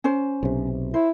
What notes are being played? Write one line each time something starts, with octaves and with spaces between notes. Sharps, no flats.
C#4 C5
B1 C3
E4 C5